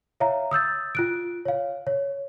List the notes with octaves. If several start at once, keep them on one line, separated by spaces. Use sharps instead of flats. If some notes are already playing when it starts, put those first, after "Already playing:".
C#5 E5 F5 A#5
D#6 E6 G6 A6
F4 F#6 D7
C#5 F5
C#5